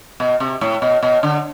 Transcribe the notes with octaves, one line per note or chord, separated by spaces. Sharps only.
B2
C3
A2
B2
B2
D3